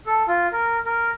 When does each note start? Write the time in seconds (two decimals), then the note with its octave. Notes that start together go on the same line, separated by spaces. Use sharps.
0.06 A4
0.28 F4
0.52 A#4
0.86 A#4